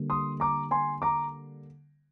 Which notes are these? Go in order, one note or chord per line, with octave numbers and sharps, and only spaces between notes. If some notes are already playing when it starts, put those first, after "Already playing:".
Already playing: D3 G3 A#3
C6 D#6
A#5 D6
G#5 C6
A#5 D6